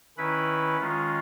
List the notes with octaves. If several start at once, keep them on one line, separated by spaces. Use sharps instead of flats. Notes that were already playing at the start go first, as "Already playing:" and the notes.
D#3 C#4 E4 B4 B5
D#3 G#3 C#4 F4